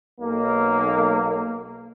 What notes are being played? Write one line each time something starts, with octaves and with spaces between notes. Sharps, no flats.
B1 A#3